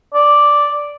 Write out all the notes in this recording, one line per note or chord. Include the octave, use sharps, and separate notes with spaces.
D5